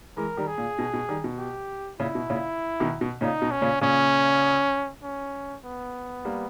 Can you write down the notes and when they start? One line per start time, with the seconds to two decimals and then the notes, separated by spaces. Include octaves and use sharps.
0.17 E3 G#3 A#4
0.37 D#3 G3
0.48 G#4
0.58 A#2
0.79 B2
0.93 B2
1.09 D#3 G3
1.24 B2
1.39 G4
2.00 A#2 C#3 E4
2.15 B2
2.30 A#2 C#3
2.80 B2 D#3
3.01 B2
3.21 A#2 C#3 D#4
3.42 B2
3.52 C#4
3.61 A#2 C#3
3.81 A#2 C#3 C#4
5.03 C#4
5.64 B3
6.25 G3 A#3